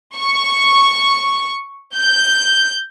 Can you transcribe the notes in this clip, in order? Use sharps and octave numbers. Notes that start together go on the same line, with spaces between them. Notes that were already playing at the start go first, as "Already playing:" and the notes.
C#6
G6